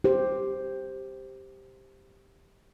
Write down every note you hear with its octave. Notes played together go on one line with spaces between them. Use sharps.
G4 C5